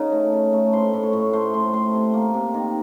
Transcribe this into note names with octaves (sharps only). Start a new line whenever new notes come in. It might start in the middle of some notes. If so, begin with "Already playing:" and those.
Already playing: C#3 D#4 A#4 A#5
A3
C#3
A3
A2 C5 C6
A2
C#5 C#6
A2
A3 C5 C6
A2 C5 C6
A3 C5 C6
C3
A#3
C3
D#3